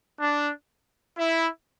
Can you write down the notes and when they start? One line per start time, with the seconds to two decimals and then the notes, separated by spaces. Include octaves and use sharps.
0.20 D4
1.18 E4